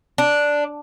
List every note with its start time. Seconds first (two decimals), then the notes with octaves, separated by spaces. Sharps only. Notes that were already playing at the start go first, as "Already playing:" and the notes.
0.18 D4